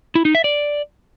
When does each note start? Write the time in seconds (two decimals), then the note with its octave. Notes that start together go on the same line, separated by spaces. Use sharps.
0.15 E4
0.25 D#4
0.35 E5
0.44 D5